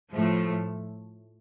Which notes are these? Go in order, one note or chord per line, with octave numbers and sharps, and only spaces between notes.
A2 F3 A3